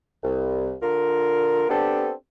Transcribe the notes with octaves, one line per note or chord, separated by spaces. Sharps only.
C2
D3 F4 A#4
B3 C4 D4 G4 A4